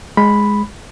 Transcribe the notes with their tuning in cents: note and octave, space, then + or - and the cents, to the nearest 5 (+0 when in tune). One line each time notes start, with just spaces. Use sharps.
G#3 +0 B5 +0